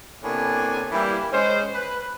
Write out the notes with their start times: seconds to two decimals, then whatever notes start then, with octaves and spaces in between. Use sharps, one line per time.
0.22 A2 C3 A#3 B3 D4 G#5
0.91 E3 G3 A#3 D4 E4
1.32 G#3 C#4 C5
1.73 B4